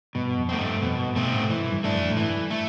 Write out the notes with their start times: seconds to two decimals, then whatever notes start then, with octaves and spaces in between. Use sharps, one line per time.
0.15 G2 B2
0.38 F2
0.49 A3 C4
0.60 G2
0.82 F2 B2
1.00 G2
1.16 B2 A3 C4
1.33 A2
1.50 G2 E3
1.72 G2
1.84 A3 D4
1.94 F2
2.11 A2
2.17 G2 E3
2.50 A3